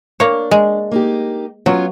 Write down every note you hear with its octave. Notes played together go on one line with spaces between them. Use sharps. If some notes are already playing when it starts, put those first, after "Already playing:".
A#3 D4 C#5
G#3
A#3 D#4 G4
F#3 B3 C#4 F4